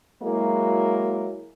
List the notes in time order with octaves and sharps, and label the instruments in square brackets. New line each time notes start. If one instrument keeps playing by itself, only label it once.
[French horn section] F#3 G#3 A#3 E4 A#4